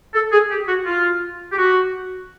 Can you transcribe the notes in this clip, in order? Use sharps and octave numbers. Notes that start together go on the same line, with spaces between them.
A4
G#4
G4
F#4
F4
G4
F#4